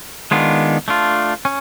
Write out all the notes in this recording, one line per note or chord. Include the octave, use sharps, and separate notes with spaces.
D#3 G#3 B3 D4 F4
A3 D4 F4
C#4